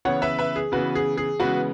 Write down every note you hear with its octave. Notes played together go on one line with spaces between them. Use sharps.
C#3 E3 B3 C#5 F#5
B4 E5
B4 E5
G#4
C#3 E3 B3 F#4 B4
G#4
G#4
C#3 E3 G#3 B3 F#4 B4